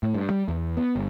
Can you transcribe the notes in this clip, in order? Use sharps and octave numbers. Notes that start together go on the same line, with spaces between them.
A2
G2
G3
E2
B3
G1